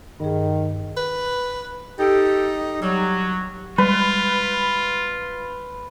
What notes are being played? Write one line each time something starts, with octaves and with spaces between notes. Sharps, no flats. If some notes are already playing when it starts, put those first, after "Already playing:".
G2 D#3 G#4
B4
D#4 G4 A4
F#3 G3
G3 G#3 F4 B4